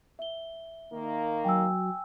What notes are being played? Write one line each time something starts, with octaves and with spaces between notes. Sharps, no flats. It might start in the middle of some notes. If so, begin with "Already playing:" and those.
E5 G7
D#3 A#3
F#3 G5 G#5 E6